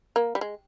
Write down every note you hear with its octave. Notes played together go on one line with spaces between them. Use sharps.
A#3
G3
G#3